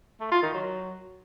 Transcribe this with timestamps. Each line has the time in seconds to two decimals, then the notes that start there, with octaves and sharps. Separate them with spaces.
0.20 A3
0.31 F4
0.43 D#3
0.54 F#3